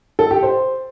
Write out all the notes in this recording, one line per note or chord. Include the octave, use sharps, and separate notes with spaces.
A4
G4
C5